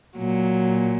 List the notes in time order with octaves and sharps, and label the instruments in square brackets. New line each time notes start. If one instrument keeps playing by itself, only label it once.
[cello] A#2 [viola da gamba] F#3